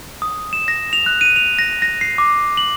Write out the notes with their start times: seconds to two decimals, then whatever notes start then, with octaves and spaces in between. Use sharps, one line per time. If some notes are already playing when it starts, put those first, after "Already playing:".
0.22 D#6
0.53 E7
0.68 A#6
0.93 F7
1.06 F#6
1.21 D#7
1.36 F7
1.59 A#6
1.82 A#6
2.01 C7
2.18 D6
2.57 F#7